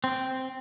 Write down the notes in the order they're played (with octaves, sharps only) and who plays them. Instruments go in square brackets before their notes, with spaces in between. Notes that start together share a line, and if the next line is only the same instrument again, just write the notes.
[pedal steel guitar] C4